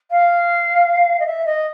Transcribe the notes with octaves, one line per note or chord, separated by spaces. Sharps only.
F5
D#5
E5
D#5